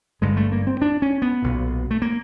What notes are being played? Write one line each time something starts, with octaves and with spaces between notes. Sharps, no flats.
G#1 G2 D3 G#3
A3
A#3
C4
D4
C#4
B3
B1 A#2
A3
A#3